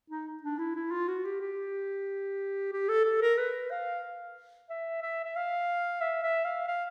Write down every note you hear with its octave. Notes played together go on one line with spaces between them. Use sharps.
D#4
D4
E4
E4
F4
F#4
G4
G4
G4
A4
A4
A#4
B4
F5
E5
E5
E5
F5
E5
E5
F5
F5